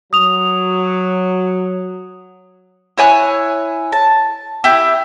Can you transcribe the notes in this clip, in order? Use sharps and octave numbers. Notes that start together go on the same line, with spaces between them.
F#3 D#6 F7
E4 C#5 G#5 F#6
A5
E4 G4